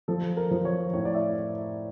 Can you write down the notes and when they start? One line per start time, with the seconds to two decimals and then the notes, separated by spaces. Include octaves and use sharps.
0.08 F3 A4
0.37 A#4
0.51 F3
0.65 C#5
0.94 A2 C#5
1.05 D5
1.14 E5